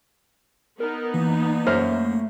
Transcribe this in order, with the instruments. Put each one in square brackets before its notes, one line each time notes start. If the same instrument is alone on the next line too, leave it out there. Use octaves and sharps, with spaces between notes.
[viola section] B3 D#4 [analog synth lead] A#4
[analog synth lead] E3 [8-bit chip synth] A#3
[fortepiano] F#2 C5 F6 [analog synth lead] A3